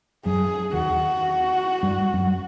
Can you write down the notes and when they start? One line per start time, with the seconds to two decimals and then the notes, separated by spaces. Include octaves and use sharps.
0.25 F#2 F#3 G#4
0.73 D#2 D#3 F#4
1.83 G2 G3
2.14 F#2 F#3